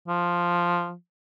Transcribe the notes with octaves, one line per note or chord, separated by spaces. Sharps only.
F3